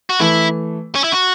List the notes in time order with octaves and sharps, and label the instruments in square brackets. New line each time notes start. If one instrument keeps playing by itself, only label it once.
[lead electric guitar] F#4
[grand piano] E3 A3 [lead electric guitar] E4
[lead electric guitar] C#4
E4
F#4